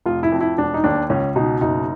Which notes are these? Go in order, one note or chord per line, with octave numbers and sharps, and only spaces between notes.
F1 F4
E4
F2
E4
E1 D4
D#4
D#2 D4
C#2 C#4
B2 D#4
F#1 D#4